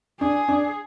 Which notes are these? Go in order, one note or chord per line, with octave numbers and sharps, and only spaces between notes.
D4 G#4
D4